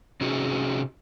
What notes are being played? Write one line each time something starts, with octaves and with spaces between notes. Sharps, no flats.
C3 C#4 D#4 F#4 G#4